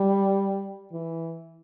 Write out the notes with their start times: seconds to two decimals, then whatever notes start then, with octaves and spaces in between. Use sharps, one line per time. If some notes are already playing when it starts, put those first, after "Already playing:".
Already playing: G3
0.92 E3